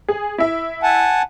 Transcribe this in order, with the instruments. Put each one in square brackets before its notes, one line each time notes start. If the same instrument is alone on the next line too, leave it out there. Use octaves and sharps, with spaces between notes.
[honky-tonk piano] G#4
E4 E5
[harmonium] F#5 G#5 A5